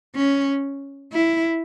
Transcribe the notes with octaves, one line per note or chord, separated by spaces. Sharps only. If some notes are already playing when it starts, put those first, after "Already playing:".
C#4
E4